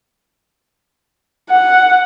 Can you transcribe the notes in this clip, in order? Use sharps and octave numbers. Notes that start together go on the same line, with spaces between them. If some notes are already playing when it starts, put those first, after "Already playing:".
F#5